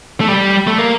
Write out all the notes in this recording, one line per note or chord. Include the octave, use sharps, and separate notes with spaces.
A3
G3
A3
A#3